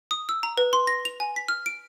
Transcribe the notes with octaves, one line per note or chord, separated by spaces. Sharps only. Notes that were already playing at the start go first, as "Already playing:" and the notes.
D#6
E6
A#5
B4
C6
A#6
F7
G#5
B6
F6
D7